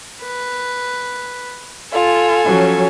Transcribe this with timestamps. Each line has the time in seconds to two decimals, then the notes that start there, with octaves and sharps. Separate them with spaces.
0.23 B4
1.92 F4 A4 G#5
2.46 F3 F#3 C#4